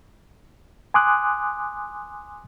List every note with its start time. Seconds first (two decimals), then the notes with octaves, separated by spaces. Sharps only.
0.94 G#5 C6 D6 D#6 F#6